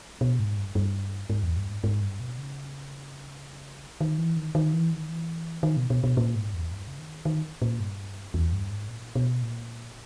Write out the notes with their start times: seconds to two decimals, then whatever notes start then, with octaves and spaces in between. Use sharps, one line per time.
0.21 B2
0.39 G#2
0.57 G2
0.75 G2
1.30 G#2
1.43 E2
1.57 G2
1.70 G#2
1.84 G#2
2.02 G2
2.20 B2
2.38 C#3
4.01 D#3
4.18 E3
4.36 D#3
4.55 D#3
4.73 E3
4.91 D#3
5.09 E3
5.63 D#3
5.77 B2
5.90 B2
6.04 B2
6.17 A#2
6.36 G#2
6.54 E2
6.71 G2
6.88 C#3
6.99 D#3
7.25 D#3
7.62 A#2
7.80 G2
8.34 E2
8.52 G2
8.70 G#2
8.88 A#2
9.15 B2
9.43 A#2